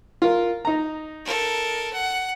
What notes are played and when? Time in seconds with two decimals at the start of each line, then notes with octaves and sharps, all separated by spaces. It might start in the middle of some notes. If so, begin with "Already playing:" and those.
0.22 F4 A#4
0.65 D#4 A#5
1.25 A4 A#4
1.93 F#5